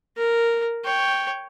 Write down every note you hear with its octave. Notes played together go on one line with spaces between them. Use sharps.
A#4
C#5 G5